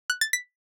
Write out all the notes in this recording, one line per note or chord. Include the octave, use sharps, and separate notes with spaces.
F#6
A6
B6